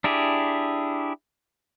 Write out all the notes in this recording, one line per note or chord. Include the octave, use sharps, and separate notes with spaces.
D4 E4 G4 G#4